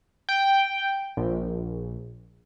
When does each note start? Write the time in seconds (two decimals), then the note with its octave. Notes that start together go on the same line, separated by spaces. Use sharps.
0.29 G5
1.17 A#1